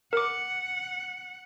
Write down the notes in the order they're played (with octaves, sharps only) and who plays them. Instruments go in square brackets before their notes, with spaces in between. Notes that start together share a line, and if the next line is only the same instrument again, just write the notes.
[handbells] A#4 D6 [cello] F#5